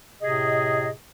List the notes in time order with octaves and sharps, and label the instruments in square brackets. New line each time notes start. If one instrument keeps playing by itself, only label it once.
[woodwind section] A2 C3 G#4 D#5